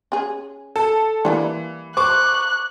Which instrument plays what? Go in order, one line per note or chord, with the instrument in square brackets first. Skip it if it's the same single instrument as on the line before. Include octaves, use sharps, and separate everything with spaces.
[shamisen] C#4 G#4
[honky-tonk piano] A4
[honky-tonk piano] E3 [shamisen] G3 G#3 A#3
[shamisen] C5 [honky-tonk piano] C#6 D6 [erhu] F#6